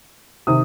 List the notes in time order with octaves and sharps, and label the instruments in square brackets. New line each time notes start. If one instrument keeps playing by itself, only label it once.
[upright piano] C3 D#3 D#6